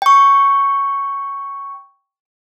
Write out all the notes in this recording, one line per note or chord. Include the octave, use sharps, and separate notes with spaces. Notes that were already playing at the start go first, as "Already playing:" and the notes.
G5 C#6